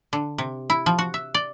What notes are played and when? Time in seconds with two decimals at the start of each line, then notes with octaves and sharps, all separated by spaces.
0.13 D3
0.38 C3
0.70 E4
0.86 F3
0.99 F#4
1.14 E5
1.34 D5